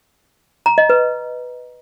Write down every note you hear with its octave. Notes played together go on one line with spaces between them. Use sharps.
A#5
D#5
B4